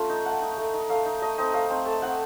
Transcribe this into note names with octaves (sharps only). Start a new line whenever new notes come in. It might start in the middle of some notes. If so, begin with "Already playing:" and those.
Already playing: A3 C#4 F4
D#4
A3 F#5
D#4
A3
D#4
A3 F5
D#4
A3 D#5
C4 D#4 D#5
A3 F5
C4 D#4
A3 A5
C4 D#4 F#5